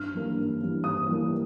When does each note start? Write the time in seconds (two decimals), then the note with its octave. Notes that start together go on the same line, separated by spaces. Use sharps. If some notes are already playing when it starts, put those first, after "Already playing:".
Already playing: G2 F6
0.13 E3 G3 A#3
0.37 G2
0.61 E3 G3 A#3
0.84 G2 D#6
1.08 E3 G3 A#3